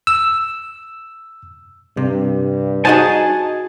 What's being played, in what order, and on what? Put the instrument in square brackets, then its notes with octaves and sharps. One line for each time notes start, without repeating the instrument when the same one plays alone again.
[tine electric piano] E6
[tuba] G2 [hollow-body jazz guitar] C3
[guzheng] D#4 F#4 G#4 [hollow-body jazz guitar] C5 D#5 [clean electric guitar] G#5 A5